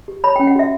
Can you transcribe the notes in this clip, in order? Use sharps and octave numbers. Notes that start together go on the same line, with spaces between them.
G4
C#5 B5
C#4 G5
F#5
F#4 E5